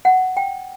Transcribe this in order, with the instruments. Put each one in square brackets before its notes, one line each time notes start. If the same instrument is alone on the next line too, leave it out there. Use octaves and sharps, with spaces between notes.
[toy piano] F#5
G5